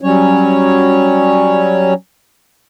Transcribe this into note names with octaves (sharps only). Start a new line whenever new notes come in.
F#3 G3 C#4 C#5